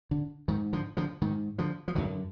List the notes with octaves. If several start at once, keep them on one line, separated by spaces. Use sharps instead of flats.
D3
G#2 D#3
D3 F3
D3 F3
G#2 D#3
D3 F3
F3
F#2 D3 D#3 F#3